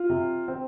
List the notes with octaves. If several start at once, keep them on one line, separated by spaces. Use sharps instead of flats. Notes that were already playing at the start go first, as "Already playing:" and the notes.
Already playing: F4
C3
C4